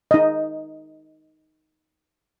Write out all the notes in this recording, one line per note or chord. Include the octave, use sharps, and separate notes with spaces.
D#4 D#5